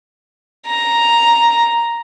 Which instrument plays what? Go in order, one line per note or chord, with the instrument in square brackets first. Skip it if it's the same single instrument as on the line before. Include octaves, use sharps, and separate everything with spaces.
[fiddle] A#5